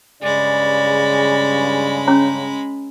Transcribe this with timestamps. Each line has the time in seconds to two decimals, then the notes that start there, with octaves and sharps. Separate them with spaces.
0.23 G2 C#3 G#3 D5 B5
2.07 C#4 C#5 A#5